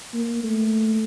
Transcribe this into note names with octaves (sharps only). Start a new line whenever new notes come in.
A#3
A3